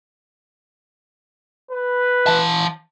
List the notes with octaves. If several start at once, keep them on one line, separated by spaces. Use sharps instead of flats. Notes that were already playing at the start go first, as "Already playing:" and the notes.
B4
E3 A5